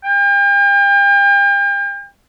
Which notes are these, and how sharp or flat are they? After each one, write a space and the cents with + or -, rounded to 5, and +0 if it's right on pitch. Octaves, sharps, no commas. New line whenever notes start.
G5 +40